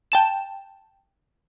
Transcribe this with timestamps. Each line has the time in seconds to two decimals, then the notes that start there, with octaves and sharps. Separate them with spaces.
0.12 G5 A5 E7